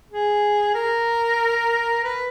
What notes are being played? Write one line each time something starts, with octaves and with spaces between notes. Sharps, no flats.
G#4
A#4
B4